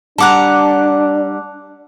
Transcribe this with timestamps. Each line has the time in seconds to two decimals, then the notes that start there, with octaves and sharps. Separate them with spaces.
0.18 G3 D4 F#5 A5 A#5 D6 F#6